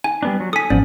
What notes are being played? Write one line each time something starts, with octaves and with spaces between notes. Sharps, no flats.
G#5
G3 B3 D4
F#3
A4 G#5 D#6 B6
G#1 F3 B3 C#4 D5